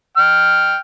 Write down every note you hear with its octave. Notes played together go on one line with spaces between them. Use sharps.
G5 F6